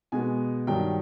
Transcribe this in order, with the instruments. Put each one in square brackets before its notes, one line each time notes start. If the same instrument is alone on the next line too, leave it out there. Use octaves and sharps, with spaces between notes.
[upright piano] B2 G#3 B3 G#5
G2 D#3 F#3 G5